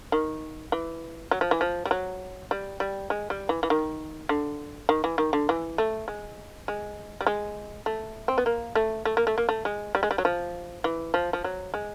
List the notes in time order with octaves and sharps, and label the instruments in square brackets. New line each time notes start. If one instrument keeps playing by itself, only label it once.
[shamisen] D#3
E3
F#3
F3
E3
F3
G3
F#3
G3
G3
G#3
G3
E3
E3
D#3
D3
D#3
E3
D#3
D3
E3
A3
G#3
G#3
G3
G#3
A3
C4
B3
A#3
A3
A3
A#3
A3
A#3
A3
G#3
G3
G#3
G3
F#3
F3
E3
F3
F3
F#3
G#3